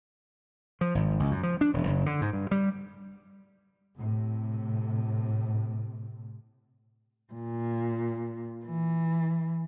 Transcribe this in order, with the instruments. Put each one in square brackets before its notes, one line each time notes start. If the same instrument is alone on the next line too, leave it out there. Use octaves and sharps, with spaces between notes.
[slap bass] F3
G#1
C#2
F#2
F3
D4
E1
F#1
D3
G#2
G2
G3
[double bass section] A2 C3
[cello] A#2
E3